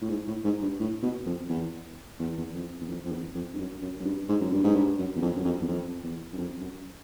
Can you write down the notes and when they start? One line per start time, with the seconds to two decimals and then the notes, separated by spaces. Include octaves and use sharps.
0.02 A2
0.10 G#2
0.27 A2
0.44 G#2
0.62 G2
0.79 A2
1.02 B2
1.26 F2
1.50 E2
2.19 E2
2.38 E2
2.54 F2
2.81 E2
2.89 F2
3.05 F2
3.12 E2
3.35 F2
3.54 G2
3.59 F#2
3.82 F#2
4.00 F#2
4.05 G2
4.29 G#2
4.41 F#2
4.52 G2
4.64 G#2
4.75 G2
4.98 F#2
5.16 E2
5.22 F2
5.37 F#2
5.45 F2
5.61 E2
5.68 F2
6.03 E2
6.33 F#2
6.38 F2
6.61 F#2